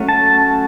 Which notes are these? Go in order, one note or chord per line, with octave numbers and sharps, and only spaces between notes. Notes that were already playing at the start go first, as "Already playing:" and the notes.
Already playing: F#3 A3 C#4
A5